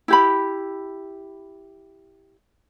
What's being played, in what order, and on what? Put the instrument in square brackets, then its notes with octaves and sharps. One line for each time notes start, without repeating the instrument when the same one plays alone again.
[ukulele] E4 G4 B5